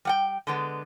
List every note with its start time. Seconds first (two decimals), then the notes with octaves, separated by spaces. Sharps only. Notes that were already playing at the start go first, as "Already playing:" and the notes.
0.05 G3 F#5 G5
0.47 D3 G#3 B3